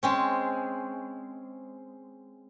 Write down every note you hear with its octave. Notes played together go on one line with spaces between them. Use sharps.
G#3 C4 C#4